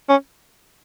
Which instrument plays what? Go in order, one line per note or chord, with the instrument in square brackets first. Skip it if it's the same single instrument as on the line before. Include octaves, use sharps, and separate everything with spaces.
[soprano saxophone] C#4